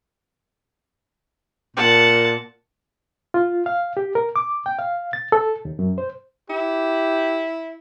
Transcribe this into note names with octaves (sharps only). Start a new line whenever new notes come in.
A#2 F#5 A5
F4
F5
G4
A#4
D6
G5
F5
A6
A4
D#2
F#2
C5
E4 G4